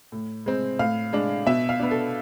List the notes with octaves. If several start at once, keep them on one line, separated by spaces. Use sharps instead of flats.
A2
G#3 C4
A2 F5
G#3 D4
B2 E5
F5
B3 D4
A4